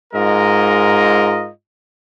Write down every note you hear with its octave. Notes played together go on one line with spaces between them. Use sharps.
G#2 G#3 F4 A#4 D#5